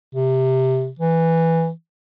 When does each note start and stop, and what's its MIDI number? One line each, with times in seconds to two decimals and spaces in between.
0.15 0.89 48
0.99 1.70 52